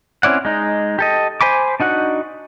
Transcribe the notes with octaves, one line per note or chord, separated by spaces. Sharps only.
C4 C#4 E4 D5 F#5
G#3 D#4
G4 A4 D#5
C5 G#5 B5 D6
D4 D#4 F#4 F#5